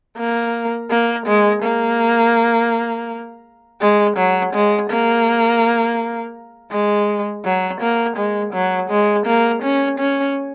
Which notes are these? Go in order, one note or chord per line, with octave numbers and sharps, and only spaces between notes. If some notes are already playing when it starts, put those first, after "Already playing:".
A#3
A#3
G#3
A#3
G#3
F#3
G#3
A#3
G#3
F#3
A#3
G#3
F#3
G#3
A#3
C#4
C#4